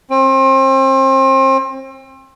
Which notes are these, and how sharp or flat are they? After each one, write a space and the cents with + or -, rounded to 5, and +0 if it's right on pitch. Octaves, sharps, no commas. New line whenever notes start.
C4 +35